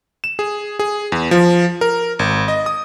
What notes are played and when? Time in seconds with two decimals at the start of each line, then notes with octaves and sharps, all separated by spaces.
0.24 E7
0.39 G#4
0.79 G#4
1.12 E2
1.31 F3
1.81 A#4
2.19 G#1
2.48 D#5
2.66 D#6